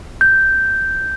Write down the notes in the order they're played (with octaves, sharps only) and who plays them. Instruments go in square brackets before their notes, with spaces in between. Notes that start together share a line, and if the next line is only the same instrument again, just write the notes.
[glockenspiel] G6